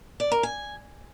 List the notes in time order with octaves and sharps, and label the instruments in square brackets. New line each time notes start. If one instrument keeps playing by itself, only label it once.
[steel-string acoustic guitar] D5
A#4
G#5